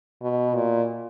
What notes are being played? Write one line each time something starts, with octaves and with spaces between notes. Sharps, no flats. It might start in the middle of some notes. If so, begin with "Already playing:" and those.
B2
A#2